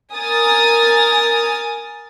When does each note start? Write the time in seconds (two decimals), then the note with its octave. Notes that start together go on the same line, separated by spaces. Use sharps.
0.14 A#4 G#5 D#6 A6